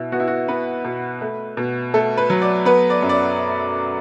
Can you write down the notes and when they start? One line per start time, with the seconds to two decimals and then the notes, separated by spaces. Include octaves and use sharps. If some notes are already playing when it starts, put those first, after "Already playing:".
Already playing: B2 E4
0.12 B3 F#4
0.20 E4
0.28 F#4
0.48 B3 B4
0.85 B2
1.21 A3
1.57 B2
1.94 A3 A4
2.17 B4
2.30 F#3
2.42 D5
2.65 B3 B4
2.90 D5
3.03 F#2
3.09 D5